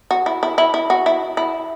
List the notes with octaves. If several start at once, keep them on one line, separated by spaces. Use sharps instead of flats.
F#4
E4
E4
E4
E4
F#4
E4
E4